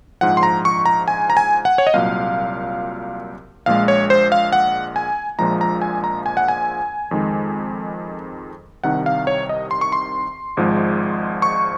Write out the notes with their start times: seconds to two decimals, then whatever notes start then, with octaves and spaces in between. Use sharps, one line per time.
0.21 A#1 G#2 F3 F#5
0.37 C6
0.43 A#5
0.65 C#6
0.85 A#5
1.08 G#5
1.30 A#5
1.37 G#5
1.65 F#5
1.78 C#5
1.87 D#5
1.94 C2 A#2 F#3 F5
3.66 A#1 A#2 G#3 F5
3.88 C#5
4.10 C5
4.32 F5
4.53 F#5
4.96 G#5
5.39 A#1 A#2 F3 G#3 A#5
5.61 A#5
5.82 G#5
6.04 A#5
6.26 G#5
6.37 F#5
6.48 G#5
7.11 F2 D#3 G#3
8.84 C2 C3 D#3 F#5
9.06 F5
9.27 C#5
9.49 D#5
9.71 C6
9.81 C#6
9.92 C6
10.57 G#1 G#2 F3 G#3
11.42 C#6